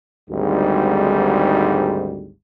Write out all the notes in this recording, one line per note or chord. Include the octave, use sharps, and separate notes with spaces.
G#1 D2 G#2 G3